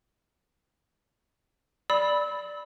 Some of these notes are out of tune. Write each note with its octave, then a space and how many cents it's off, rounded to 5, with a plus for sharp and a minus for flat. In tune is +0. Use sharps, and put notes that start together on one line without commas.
D5 +0 B5 +0 E6 -30